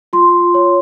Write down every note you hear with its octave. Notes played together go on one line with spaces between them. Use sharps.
F4 C6
C#5